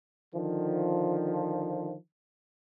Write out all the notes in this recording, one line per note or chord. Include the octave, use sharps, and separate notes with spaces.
D3 D#3 F3